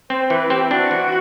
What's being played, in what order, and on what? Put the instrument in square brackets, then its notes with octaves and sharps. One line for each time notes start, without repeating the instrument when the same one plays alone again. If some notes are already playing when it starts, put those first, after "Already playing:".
[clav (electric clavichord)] C4 [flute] C5
[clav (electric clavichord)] E3 [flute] B4
[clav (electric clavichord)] C4 [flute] G4
[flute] E4
[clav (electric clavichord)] D4 [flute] F#4
[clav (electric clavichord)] E3